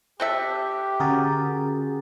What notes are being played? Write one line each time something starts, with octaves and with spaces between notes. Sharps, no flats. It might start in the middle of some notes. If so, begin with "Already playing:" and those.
C4 G4 A4 E5 F#6
D3 C#4 F#4 G#4 A#4 A6